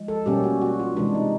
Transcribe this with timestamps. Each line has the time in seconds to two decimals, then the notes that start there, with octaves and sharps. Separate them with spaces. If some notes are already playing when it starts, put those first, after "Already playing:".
Already playing: F3 G#3
0.08 A4
0.26 B2 G3 A#3 C#4 G4
0.44 F#4
0.62 F#4
0.80 F4
0.96 C3 E3 G#3 D4
1.15 D#4